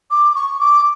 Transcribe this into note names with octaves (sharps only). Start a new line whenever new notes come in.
D6
C#6
D6